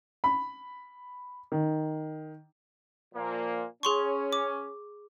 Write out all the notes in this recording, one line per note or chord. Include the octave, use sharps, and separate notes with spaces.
B5
D#3
A#2 F3 A#3
C#4 G#4 C6 C#6
D6